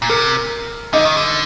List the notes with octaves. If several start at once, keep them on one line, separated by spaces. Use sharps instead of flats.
A#2
C3 A#4
D3 D#4 D#5
D#3
D3